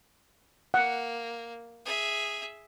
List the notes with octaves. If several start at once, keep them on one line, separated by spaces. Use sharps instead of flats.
A#3 F#5
G#4 E5